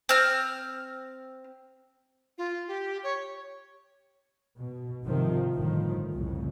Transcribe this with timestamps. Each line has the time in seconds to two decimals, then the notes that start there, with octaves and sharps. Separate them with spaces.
0.09 C4 F6
2.38 F4
2.68 G4
3.03 C#5
4.58 B2
5.04 G#1 C3 D#3 F3
5.54 G1 A2 D#3 F3
6.12 C2 F2 A2 C#3